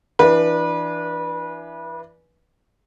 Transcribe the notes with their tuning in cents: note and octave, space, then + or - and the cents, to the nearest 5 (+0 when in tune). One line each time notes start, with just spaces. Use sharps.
E3 +20 D4 +20 B4 -25